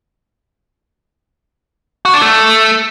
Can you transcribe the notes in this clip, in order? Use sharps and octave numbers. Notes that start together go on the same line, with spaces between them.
F#4
D4
A3